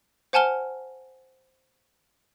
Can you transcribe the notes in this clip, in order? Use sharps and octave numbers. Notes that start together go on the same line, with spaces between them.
C5 F#5 G#5 A5 F6 G7